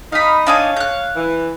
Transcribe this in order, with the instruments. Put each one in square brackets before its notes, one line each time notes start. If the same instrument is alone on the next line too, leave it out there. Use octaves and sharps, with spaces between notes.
[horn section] D#4 [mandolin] F5 B5
[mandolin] D4 D#4 G#5 [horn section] C#5 F5
[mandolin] F#6 G6
[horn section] E3